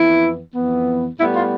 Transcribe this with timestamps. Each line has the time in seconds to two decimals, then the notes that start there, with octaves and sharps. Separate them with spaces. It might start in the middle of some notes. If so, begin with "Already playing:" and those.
Already playing: F2 E3 B3 E4
0.54 F2 E3 B3
1.18 A2 G3 B3 E4
1.34 F4